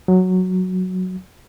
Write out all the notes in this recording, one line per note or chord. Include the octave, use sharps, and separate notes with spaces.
F#3